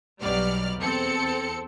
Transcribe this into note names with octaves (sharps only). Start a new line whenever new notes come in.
B1 B2 F#3 G3 D5 F6
E2 C4 A4 C#7